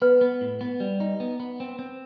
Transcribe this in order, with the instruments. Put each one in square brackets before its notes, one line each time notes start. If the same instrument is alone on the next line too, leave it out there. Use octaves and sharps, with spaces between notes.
[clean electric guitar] B3 [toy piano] B4
[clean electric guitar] B3
A2
B3
G3
D#4
B3
B3
C4
C4